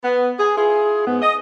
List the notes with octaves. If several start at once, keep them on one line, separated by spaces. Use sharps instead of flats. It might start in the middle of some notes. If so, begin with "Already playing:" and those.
B3
G#4
E4 F4 G#4
G#2 B3
D#5